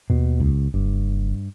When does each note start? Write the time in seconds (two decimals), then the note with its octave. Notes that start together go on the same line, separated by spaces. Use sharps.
0.10 D#2 B2
0.40 C#2
0.74 F#1 G2